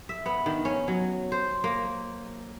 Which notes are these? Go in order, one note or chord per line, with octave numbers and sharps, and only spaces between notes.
E5
B3
D#3
C#4
F#3
C5
A#3